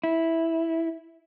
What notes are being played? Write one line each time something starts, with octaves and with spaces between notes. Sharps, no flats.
E4